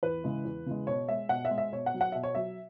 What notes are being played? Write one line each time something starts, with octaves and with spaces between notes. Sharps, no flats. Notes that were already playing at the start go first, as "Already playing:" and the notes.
E2 B4
C#3 E3 G#3
E2
C#3 E3 G#3
B2 C#5
G#3 E5
B2 F#5
E5
G#3
E5
B2 C#5
F#5
F#3
F#5
B2 E5
C#5
F#3 E5